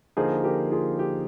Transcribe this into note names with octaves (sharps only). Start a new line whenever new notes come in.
D3 F3 A#3 D#4 G#4 C5
G4 A#4
F4 G#4
G4